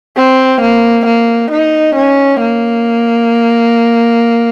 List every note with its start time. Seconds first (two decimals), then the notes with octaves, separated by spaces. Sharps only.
0.16 C4
0.61 A#3
1.06 A#3
1.51 D#4
1.95 C#4
2.40 A#3